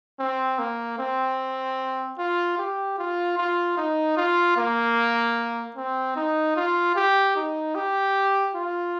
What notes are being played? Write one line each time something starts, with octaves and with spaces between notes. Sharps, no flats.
C4
A#3
C4
F4
G4
F4
F4
D#4
F4
A#3
C4
D#4
F4
G4
D#4
G4
F4